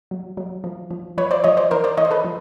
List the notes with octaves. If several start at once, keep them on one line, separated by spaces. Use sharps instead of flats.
F#3
F#3
F3
F3
F3 B4 C#5
C5 D5
F3 C#5 D#5
C5 D5
E3 A#4 C5
C5 D5
E3 C#5 D#5
C5
A4 B4
F3